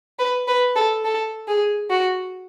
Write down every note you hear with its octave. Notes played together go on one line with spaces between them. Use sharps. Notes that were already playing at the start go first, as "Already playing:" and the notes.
B4
B4
A4
A4
G#4
F#4